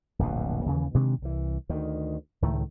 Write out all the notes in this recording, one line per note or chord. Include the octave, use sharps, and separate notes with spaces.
D1 A#1 F2 B2
D#2 C#3 E3
B2 D#3 G#3 D4
C2 E3
D2 D#3
C#2 A2 D#3 A3